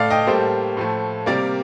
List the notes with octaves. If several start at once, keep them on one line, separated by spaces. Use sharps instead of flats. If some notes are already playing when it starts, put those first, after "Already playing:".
Already playing: A2 A3 D5 F5
D#5 G5
A2 G3 A#3 A4 C5
A2 F3 A3
C3 G3 A#3 A#4 D5